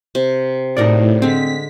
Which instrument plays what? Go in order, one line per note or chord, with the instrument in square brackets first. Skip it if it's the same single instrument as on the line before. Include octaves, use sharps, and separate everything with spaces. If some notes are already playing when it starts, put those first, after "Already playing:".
[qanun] C3
[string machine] A2 [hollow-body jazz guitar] D#4 D5 [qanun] F#4 A#4 F#5
[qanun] D3 G#3 [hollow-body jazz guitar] C4 [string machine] B6